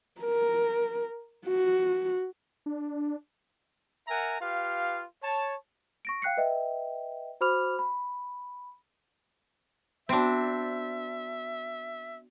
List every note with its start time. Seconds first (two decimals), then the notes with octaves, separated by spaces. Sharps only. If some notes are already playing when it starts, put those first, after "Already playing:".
0.21 A#4
1.46 F#4
2.66 D4
4.08 A#4 E5 F#5 G#5 A#5
4.40 F4 G4 B4 F5
5.23 C#5 A5
6.05 C#6 A#6 D7
6.22 F5 G5 F#6 C7 C#7
6.37 B4 D#5 E5 G5
7.41 F#4 C5 B5 D6 F6 F7
7.79 B5
10.09 B3 C4 D4 F#4 E5